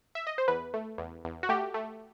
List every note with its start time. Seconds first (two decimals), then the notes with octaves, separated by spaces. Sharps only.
0.15 E5
0.27 D#5
0.38 C5
0.48 E2 B4
0.74 A3
0.98 E2
1.24 E2
1.43 F#4
1.49 A3 G4
1.74 A3